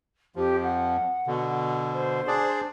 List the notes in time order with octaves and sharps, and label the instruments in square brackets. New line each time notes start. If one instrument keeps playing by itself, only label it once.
[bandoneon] F2 F3 [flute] G4
[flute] F#5
[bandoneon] B2 D3
[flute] C5
[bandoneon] D4 G#4 D5